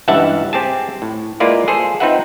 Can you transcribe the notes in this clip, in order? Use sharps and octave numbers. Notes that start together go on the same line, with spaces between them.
C#2 G2 E3 E5 F#5 A5
C4 G4 G#4 A5
A2
G#3 A#3 E4 F4 B4 D5
G#4 A4 C5
C4 D#4 F4 B4 E5 F#5